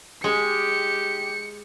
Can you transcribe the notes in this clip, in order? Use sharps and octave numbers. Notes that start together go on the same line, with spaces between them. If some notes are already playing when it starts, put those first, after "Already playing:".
G#3 G4 C#7